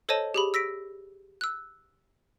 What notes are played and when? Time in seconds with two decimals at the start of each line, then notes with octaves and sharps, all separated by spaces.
0.09 A4 C5 C#5 D#5 A5 D#7
0.34 G4 G#4 B5
0.54 E6 A#6 B6 D7
1.41 E6 F#6